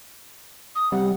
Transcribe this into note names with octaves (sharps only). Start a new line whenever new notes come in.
D#6
C3 G3 F#5